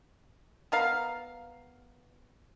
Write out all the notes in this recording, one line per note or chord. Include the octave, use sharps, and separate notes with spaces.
B3 A#4 F5